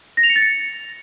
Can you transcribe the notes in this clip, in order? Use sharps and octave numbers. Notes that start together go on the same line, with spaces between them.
A#6
F7
C#7
A6
C#7